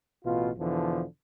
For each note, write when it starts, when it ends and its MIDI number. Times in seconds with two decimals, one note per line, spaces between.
0.25 0.50 33
0.25 0.50 47
0.25 0.50 65
0.58 1.05 40
0.58 1.05 47
0.58 1.05 50
0.58 1.05 52
0.58 1.05 53